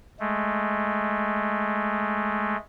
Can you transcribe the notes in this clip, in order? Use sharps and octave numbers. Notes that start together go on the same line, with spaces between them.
G#3 A3